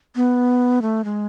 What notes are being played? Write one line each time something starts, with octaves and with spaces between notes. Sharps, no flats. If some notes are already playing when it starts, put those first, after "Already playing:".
B3
A3
G#3